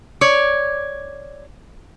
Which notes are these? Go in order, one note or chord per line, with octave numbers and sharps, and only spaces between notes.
C#5 D5